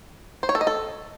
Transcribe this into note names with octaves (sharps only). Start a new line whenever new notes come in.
C5
C#5
A4
D#5
A4